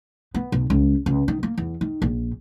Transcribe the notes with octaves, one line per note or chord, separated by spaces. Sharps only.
B3
B1
C#2
C#2
D#3
A#3
E2
D#3
A#1